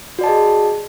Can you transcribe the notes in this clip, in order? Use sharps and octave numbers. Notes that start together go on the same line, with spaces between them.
F#4 G#4 D5 D#5 A5